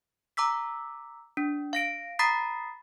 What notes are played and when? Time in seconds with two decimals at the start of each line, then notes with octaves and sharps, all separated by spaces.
0.37 A#5 D6 E6 B6
1.37 D4
1.73 F5 A#6 D7
2.19 A#5 B5 D#6 A6 B6 C7